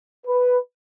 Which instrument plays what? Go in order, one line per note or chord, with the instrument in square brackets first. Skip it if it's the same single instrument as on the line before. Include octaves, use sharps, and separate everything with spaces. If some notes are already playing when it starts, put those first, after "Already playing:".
[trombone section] B4